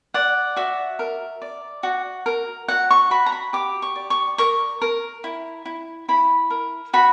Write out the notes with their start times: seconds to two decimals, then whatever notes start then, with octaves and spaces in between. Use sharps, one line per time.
0.14 D5 F#5
0.56 F#4 E5
0.99 A#4
1.42 D5
1.83 F#4
2.26 A#4
2.68 F#4 F#5
2.91 C#6
3.11 F#4 B5
3.26 A#5
3.32 B5
3.53 G4 D6
3.82 C#6
3.95 D5
4.10 C#6
4.38 A#4 C#6
4.82 A#4
5.24 E4
5.66 E4
6.09 E4 B5
6.50 A#4
6.93 F#4 B5